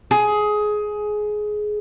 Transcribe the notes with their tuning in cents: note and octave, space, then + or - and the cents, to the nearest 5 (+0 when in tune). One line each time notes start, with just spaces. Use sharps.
G#4 +15